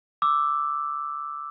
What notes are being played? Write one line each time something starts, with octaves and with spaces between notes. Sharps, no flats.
D6 E6